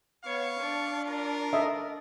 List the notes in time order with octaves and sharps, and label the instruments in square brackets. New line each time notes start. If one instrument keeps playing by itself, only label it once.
[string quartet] B3 C#5 [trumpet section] F5 C#6
[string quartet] D4 D5
[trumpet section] F4 A#4
[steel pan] A4 D#5 E5